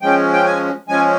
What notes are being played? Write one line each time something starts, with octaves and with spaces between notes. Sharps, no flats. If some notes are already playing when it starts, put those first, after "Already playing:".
F3 G#3 C#4 G5
G5
G#5
F3 G#3 C#4 G#5